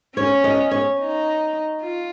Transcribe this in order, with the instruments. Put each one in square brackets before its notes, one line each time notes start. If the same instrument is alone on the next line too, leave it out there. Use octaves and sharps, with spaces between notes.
[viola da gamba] C#4 [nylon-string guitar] C#5
[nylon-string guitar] D#5
C#5
[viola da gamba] D#4
F4